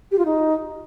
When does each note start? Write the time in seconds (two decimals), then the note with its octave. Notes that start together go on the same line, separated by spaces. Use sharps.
0.12 G4
0.18 F4
0.25 D#4